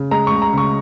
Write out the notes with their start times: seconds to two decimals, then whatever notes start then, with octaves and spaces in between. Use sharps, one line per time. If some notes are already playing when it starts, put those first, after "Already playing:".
Already playing: C#3
0.11 G#3 A#5
0.27 C#2 C#6
0.42 A#5
0.53 C#3 C#6